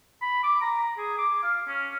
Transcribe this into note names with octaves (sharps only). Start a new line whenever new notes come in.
B5
D6
A#5
G#4
D6
F5
C#4